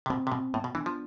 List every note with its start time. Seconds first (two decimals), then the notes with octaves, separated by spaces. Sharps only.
0.06 C3
0.10 B2 C4
0.27 C3
0.32 B2 C4
0.54 A2 B3
0.64 B2
0.75 E3 D4
0.86 F3